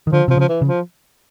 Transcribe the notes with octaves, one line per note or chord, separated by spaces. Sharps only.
D#3
D3 F3
C3 F3
C#3
F3
E3
C#3
F3